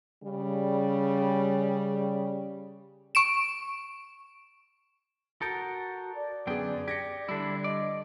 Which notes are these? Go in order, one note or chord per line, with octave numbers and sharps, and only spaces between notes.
C#3 G3
C#6 D7 E7
F#4 A4 A#4 D#6 G6 A6
D5
F#2 D3 B3 G#4 G5
G4 G#6 A#6 C#7
D3 G3 D4 E4
D5 D#5